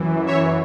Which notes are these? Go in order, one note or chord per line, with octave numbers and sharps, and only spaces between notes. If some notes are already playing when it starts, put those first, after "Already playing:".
Already playing: F#2 E3
C#5 E5